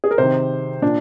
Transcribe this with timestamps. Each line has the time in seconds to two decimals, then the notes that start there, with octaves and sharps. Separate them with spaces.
0.04 G#4
0.11 A#4
0.18 C3 D#3 C5
0.82 A#2 D4